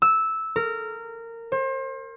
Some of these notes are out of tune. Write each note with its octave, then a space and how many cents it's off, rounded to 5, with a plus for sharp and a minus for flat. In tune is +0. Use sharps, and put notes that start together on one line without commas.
E6 -10
A#4 -20
C5 +35